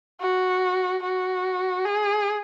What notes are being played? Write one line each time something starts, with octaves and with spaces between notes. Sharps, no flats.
F#4
F#4
G#4